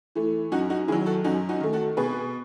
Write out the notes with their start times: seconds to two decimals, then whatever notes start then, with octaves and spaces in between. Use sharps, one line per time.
0.15 E3 A3
0.52 F#2 D#4 F#4
0.70 D#4 F#4
0.88 D#3 F#3 E4 G#4
1.06 F#4 A4
1.24 F#2 D#4 F#4
1.49 D#4 F#4
1.60 D#3 A3
1.73 F#4 A4
1.97 B2 G#4 B4